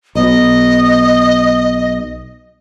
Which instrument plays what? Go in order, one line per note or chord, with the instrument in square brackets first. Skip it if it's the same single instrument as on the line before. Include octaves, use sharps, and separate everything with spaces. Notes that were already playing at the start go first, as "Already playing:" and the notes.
[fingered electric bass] B1 B2 [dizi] D#5